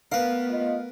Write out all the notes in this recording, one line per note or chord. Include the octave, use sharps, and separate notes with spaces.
A3 B3 A#4 B4 F5
F4 D#5